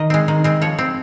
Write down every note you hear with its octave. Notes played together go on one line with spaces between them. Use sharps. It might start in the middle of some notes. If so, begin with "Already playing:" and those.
Already playing: D#3 D#5
G#3 C4
D#3
G#3 C4
F3 C#5
C4